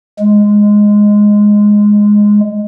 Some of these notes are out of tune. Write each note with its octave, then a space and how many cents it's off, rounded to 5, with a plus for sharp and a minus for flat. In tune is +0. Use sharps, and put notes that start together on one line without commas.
G#3 +0